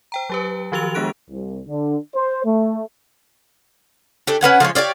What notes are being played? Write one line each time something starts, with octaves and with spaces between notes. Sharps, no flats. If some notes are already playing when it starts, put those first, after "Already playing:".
C5 G5 A#5
F#3 G4 B4
D#3 F3 F#4 G4 E6 F7
G#3 B3 D4 G#4 F#6 D7
C2
D3
C5
A3
A3 D4 G4
C#4 B4 F#5 G#5
F3 G#3 A#4 C#5
G4 C#5 D5 F5